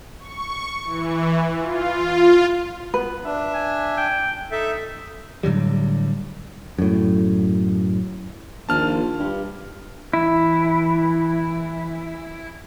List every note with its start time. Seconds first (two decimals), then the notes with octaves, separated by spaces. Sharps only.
0.19 C#6
0.84 E3
1.58 F4
2.94 B3 B4
3.25 D4 E5
3.54 G#5
3.98 G5
4.52 D#4 A4 E5
5.43 A2 D3 F#3 G3
6.79 F#2 A2
8.69 A#1 D#2 D#3 F4 A5 F6
9.19 G2 G4
10.13 E3 E4